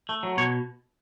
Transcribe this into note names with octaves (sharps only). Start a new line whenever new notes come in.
A3
F#3
B2 C#5